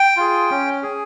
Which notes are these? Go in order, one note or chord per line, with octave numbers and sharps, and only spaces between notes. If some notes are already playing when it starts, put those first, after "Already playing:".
Already playing: G5
F4 G#4
C#4
G#4